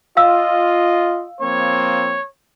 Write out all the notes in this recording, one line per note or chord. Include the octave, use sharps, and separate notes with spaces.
F4 D#5 F5 E6
F3 A#3 C4 C#5